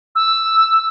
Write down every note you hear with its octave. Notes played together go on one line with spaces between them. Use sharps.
E6